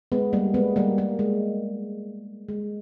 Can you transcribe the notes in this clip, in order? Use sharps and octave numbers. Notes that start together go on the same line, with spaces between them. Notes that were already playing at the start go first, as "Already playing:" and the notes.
G#3 B3
G3 A#3
G#3 B3
G3 A#3
G3 A#3
G#3
G#3